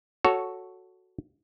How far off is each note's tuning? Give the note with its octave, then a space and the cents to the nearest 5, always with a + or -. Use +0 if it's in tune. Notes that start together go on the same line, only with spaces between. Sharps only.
F#4 +0 A4 +0 C#5 +10